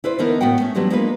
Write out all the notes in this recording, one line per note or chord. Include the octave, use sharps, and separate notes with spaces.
E4 B4 C5 D5
D3 E3 B3 D#4 A#4 B4
A2 B3 C#4 F#4 F#5 G5
A3 C#4
E3 F#3 G3 B3 D4 F4
G#3 A#3 B3 D4 F4 B4